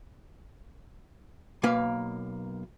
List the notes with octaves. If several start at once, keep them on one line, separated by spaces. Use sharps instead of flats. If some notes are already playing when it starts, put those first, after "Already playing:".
B1 A#3 B4 F5